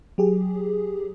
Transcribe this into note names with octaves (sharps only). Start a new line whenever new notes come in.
F#3 G4 G#4